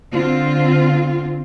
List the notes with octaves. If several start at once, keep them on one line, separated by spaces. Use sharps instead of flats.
D3 C4 F4